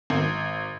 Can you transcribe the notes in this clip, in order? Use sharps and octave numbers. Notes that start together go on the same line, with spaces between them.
G#1